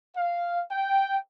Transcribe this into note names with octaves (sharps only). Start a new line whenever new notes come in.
F5
G5